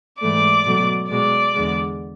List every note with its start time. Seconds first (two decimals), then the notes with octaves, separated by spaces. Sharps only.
0.21 G#2 E3 A3 D5 D6
0.65 B2 F#3 A3
1.10 B2 G#3 D5 D6
1.54 E2 D3 G#3